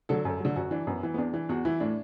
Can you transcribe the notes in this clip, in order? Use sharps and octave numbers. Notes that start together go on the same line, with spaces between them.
D3 F#3 A4
F#2 A4
D3 F#3
F#2 F#4
E3 D4
F#2 B3
E3
B3
E2 D4
E3
E2 F#4
E3 E4
A2 D4